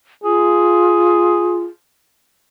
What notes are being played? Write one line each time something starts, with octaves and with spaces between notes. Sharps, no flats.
F4 G#4